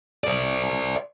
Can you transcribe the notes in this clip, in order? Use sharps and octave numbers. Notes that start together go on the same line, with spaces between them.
C5 D5